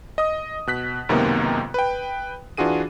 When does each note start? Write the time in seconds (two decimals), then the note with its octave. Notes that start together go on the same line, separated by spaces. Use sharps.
0.18 D#5 D#6
0.67 B2 F#6 B6
1.09 C#2 F#2 C3 D#3 A#3 B3
1.74 B4 G5
2.57 E3 D4 F4 F#4 G#4 D#7